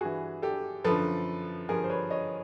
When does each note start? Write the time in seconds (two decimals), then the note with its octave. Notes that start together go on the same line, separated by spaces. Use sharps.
0.01 G2 E3 F#4 G#4
0.42 G4 A4
0.84 F#2 D3 F3 A4 B4
1.69 G2 D3 F3 G#4 A#4
1.84 C5
1.90 B4 C#5
2.10 C#5 D#5